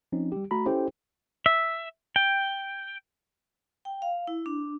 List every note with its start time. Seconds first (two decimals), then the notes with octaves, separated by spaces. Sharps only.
0.12 F3 C4 C#4 D#4
0.32 G3 G4
0.51 A3 F#4 A#5 B5
0.66 C#4 E4 G4 A4 C5 G5
1.46 E5
2.16 G5
3.85 G5
4.02 F5
4.27 E4
4.46 D4